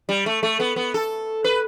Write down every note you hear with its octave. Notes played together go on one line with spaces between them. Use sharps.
G3
A3
A3
B3
B3
A4
B4